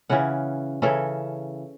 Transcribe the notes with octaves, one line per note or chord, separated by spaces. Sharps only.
C#3 E3 C#4 F#5
C#3 E3 C#4 A4